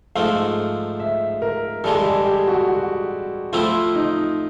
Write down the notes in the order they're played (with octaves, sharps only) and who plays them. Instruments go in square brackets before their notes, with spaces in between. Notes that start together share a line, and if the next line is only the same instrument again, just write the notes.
[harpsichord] G#2 F3 A3 [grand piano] F5
[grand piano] E5
A#4
[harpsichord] G2 E3 G#3 [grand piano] A4
[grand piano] G#4
G4
G4
F#4
F#4
[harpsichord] F3 A3 C4 E4 [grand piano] F4
[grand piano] D#4